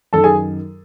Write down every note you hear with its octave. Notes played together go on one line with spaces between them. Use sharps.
F#2 D#3 A4 A5
G#4 G#5